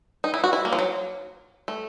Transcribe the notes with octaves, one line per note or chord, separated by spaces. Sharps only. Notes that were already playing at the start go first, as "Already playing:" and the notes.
D#4
E4
F#4
E4
A#3
F3
F#3
A3